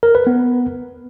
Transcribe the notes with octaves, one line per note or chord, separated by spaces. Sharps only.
A#4
B4
B3